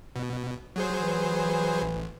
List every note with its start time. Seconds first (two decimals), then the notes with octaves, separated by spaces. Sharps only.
0.16 B2
0.76 F#3 G#4 C5
0.95 E3
1.82 A1